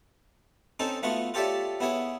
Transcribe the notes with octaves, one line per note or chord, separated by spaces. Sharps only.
C4 C#4 D#4 A4
A3 B3 F4 F#4 C#6
F4 G4 A4 C#5 D5 E5
B3 E4 G#4 C#5